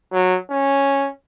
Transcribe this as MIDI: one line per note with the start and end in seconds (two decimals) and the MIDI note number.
0.13 0.37 54
0.50 1.09 61